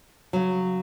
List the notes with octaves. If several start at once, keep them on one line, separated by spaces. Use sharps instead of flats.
C#3 F#3